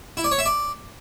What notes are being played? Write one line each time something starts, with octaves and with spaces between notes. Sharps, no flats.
E4
D5
C#5
E5
D5